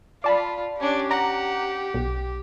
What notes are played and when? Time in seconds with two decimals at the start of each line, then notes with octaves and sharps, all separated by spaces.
0.24 F4 D5 A5 B5
0.80 C#4 D4 G4
1.11 F#5 A#5
1.94 B1